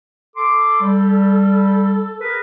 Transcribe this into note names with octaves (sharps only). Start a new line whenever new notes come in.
A4 C6 D6
G3
G#4 A#4 B4